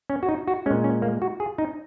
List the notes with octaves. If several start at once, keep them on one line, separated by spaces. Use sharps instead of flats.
C#4
F#4
D#4
F#4
A#2 G#3 C#4
C#4
A#3
F#4
G#4
D#4